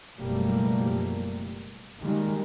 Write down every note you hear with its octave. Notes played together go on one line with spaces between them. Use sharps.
F#1 B2 F3 G3 A3 A#3
D#3 G3 G#3 A#3